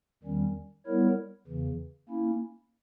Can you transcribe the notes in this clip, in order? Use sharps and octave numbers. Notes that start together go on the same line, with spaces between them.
E2 D#3 G3 C#4
G3 B3 E4 A#4 C#5
E2 C#3 E3
A#3 C#4 E4